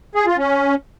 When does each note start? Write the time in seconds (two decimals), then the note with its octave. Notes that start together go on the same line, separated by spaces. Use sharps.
0.15 G#4
0.26 F4
0.38 C#4